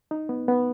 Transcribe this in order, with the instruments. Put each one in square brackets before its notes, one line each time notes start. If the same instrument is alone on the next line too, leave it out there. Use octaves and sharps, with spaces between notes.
[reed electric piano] D#4
B3
B3